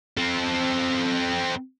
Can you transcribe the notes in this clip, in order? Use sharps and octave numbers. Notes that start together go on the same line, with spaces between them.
C4 A4